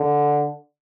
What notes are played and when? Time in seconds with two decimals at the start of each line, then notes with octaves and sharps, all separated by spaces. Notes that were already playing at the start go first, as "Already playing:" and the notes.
Already playing: D3